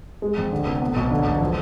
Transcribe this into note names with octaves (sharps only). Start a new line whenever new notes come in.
G#3
F2
D3
F1
B3
B1
D3
E1
F3